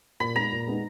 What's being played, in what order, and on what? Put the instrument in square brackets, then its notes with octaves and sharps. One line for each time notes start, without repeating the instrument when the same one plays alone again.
[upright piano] A#2 [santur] B5
[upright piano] G#3 B3 D#4 [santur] A#5
[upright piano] A#2
G#3 B3 D#4